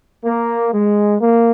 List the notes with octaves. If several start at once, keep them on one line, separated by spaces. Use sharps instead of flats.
A#3
G#3
A#3